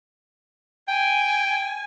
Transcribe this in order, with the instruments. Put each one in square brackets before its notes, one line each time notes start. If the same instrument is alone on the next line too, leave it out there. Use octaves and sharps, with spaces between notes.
[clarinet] G5 [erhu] G#5